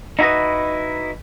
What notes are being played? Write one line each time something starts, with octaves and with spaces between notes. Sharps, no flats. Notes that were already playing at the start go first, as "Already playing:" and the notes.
D#4 E4 F#4 B4 D#5